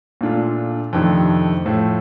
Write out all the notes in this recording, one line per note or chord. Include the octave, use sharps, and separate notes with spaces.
A#2 A3 D4 F4
F2 C3 D#3 A3 D4
A2 F3 A3